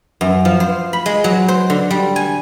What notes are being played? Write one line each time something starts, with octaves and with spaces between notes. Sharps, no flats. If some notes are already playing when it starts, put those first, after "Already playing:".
F#2
F3
C5
B5
G#3
F#3
C5
D3
G3
G#5